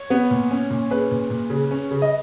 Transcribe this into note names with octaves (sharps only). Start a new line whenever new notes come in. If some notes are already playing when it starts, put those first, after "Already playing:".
Already playing: C#5
B3
A#2
C#4
A#2
C#4 G#4 B4
A#2
A#2
C#3
C#4
C#3
D#5